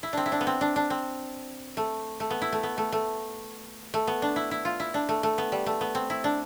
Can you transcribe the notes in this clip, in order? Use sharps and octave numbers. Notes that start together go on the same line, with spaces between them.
E4
C4 D4
E4
D4
B3
C4
D4
D4
C4
A3
A3
B3
E4
A3
B3
A3
A3
A3
B3
D4
E4
E4
F4
E4
D4
A3
A3
B3
G3
A3
B3
C4
E4
D4